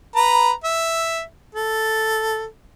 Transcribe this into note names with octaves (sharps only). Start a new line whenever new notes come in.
B4 A#5
E5
A4